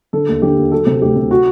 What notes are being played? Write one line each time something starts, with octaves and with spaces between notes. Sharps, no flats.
D3 A4
D#2
D3 G4
D#2
F#3 A4
C3
D2 G4
C3
F#4